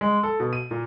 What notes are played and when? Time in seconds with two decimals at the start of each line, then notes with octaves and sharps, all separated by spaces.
0.01 G#3
0.23 A4
0.40 B2
0.53 D#7
0.71 A#2